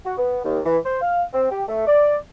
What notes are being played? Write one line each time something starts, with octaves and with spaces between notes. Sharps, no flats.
F#4
B3
D#2
E3
C5
F5
C4
G4
A3
D5